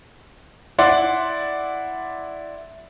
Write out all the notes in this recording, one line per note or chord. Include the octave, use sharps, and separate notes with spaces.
E4 D5 F#5 C6